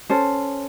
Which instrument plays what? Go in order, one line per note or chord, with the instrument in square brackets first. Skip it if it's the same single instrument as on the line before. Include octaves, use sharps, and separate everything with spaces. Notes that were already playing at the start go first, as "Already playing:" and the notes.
[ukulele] C#4 A4 C5